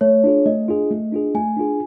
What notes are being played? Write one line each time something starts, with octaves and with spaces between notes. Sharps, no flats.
A3 C#5
D4 F4 G#4
A3 D#5
D4 F4 G#4
A3
D4 F4 G#4
A3 G#5
D4 F4 G#4